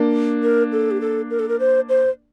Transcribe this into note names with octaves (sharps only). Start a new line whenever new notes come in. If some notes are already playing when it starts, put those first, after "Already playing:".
Already playing: A#3 D4
A#4
A4
G4
A4
A#4
A4
A#4
C5
C5